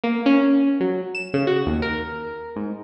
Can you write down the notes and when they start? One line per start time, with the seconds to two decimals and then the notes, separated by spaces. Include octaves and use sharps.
0.04 A#3
0.26 C#4
0.80 F#3
1.15 E7
1.34 C#3
1.47 F#4
1.66 D#2
1.82 A#4
2.56 G#2